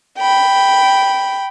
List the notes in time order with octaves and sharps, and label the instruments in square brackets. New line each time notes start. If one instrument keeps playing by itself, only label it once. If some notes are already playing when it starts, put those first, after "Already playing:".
[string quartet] G5 B5